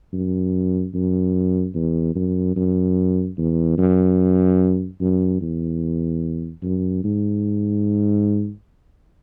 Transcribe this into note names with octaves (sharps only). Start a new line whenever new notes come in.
F#2
F#2
E2
F#2
F#2
E2
F#2
F#2
E2
F#2
G#2